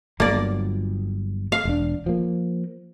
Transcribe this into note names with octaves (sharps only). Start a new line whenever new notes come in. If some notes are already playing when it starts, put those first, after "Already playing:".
G1 F#3 A#3 D5
F5
E1 D4
F3 A#3